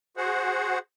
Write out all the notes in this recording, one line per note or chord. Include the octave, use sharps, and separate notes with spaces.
F#4 G#4 C5 F#5